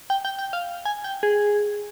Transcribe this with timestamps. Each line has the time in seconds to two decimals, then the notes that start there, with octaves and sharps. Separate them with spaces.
0.10 G5
0.25 G5
0.39 G5
0.53 F5
0.85 G#5
1.04 G5
1.23 G#4